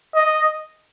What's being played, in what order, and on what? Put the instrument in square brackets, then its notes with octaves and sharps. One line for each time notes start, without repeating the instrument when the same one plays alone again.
[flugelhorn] D#5